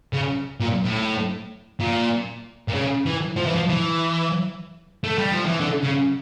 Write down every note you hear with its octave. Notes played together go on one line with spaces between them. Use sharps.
C#3
A#2
A2
A#2
A#2
C#3
E3
F3
E3
F3
E3
A3
G3
F3
E3
D3
C#3